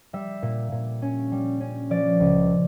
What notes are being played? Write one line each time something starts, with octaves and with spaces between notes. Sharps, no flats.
G3 E5
A#2
A#2
C#4
G3
C#4
F3 D5
C#2